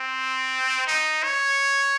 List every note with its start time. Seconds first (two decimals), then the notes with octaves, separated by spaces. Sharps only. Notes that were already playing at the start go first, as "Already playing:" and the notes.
Already playing: C4
0.87 D#4
1.23 C#5